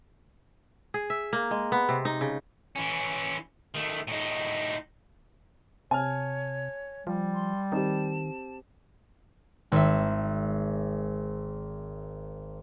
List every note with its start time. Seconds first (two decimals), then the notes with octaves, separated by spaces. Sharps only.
0.94 G#4
1.10 E5
1.33 A#3
1.51 G#3
1.72 B3
1.89 C3
2.05 D#4
2.21 C#3
2.76 E3 C#4
3.75 D#3 A3
4.07 A2 D#4
5.91 C3 C#5 G#5 A5 F6
7.07 F3 G3
7.34 C6
7.72 D#3 C4 G4 A5
9.72 G#1 E5